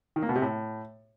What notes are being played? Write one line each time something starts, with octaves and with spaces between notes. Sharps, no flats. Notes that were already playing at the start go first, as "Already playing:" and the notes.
D#3
A#3
B2
C3
A2